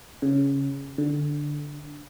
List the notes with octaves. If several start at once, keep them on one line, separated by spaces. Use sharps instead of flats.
C#3
D3